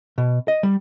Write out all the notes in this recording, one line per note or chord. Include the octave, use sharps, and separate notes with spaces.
B2
D#5
G3